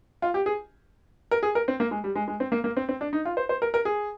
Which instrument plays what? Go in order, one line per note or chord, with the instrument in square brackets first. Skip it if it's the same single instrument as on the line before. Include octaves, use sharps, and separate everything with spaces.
[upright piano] F4
G4
G#4
A#4
G#4
A#4
C4
A#3
G#3
G3
G#3
G#3
C4
A#3
A#3
C4
C4
D4
D#4
F4
C5
C5
A#4
A#4
G#4